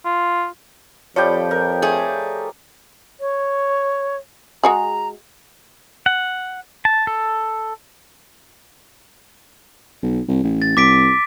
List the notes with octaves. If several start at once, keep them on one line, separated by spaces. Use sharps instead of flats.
F4
F2 F3 G3 C#5 G5
A#4
A3 G#4
C#5
G#3 F#4 G#4 A#5
F#5
A5
A4
B1
C2
A1
A6
C2 D6 B6 D7